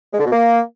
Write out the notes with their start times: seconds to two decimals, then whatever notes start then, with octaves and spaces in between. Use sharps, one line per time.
0.13 G#3
0.19 D3
0.26 B2
0.32 A#3